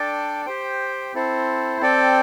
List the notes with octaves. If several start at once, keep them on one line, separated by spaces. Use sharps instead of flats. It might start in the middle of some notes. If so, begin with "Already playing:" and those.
Already playing: D4 A4 D5 G5
G4 C5 G5
C4 E4 A4 C5
C4 A4 D5 G5